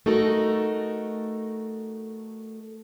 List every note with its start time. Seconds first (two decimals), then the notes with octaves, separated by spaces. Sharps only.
0.06 A3 D#4 F#4 A4 A#4